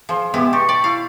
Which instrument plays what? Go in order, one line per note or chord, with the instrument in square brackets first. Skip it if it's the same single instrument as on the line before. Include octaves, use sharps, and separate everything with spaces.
[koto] F3 [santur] G#4 C6
[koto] B2 G#3 E4 [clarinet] B3 [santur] G4 D6
[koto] G4 [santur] A5 C6 [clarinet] C#6
[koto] D5
[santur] E4 [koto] F5